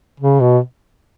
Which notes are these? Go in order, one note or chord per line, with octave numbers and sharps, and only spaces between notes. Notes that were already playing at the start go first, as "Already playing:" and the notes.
C#3
B2